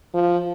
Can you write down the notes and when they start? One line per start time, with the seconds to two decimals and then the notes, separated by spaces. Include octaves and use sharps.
0.15 F3